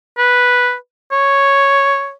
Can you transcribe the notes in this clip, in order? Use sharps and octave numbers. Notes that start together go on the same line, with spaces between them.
B4
C#5